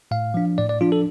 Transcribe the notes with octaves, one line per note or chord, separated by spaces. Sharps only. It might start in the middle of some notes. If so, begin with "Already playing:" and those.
A2 F5
F3 D4
A2 D5
D5
F3 D4 F4
A4